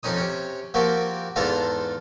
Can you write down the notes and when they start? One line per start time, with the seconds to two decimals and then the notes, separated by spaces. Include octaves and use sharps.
0.03 F2 C4 C#4 D#4 D#6
0.16 C3 C#4
0.74 F3 A#3 C4 F#4 G4
1.36 E2 G#2 F4 A4 F5 A#5